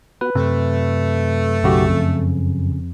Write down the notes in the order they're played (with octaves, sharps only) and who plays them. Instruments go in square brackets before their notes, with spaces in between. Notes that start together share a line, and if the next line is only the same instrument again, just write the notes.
[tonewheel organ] B3 F#4 [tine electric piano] B4
[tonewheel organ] F#2 [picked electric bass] C3 [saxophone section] A3
[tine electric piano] B1 F#4 G4 [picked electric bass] C#3
[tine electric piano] F2